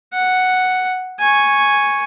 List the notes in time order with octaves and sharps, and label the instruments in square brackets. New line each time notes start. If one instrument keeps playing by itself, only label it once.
[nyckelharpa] F#5
G#5 C#6